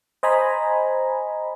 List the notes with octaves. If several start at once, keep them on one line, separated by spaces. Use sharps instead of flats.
C5 D#5 G#5 A#5 B5